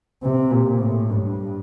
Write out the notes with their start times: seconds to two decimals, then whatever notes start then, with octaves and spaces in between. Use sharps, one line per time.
0.23 C3
0.51 A#2
0.80 A2
1.10 G2